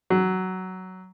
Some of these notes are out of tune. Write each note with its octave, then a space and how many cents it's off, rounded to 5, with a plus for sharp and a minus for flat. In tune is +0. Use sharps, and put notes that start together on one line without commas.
F#3 +10